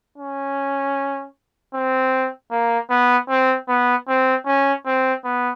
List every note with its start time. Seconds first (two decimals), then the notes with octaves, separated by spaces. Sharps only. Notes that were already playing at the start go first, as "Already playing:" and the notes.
0.18 C#4
1.74 C4
2.51 A#3
2.90 B3
3.29 C4
3.68 B3
4.08 C4
4.46 C#4
4.86 C4
5.25 B3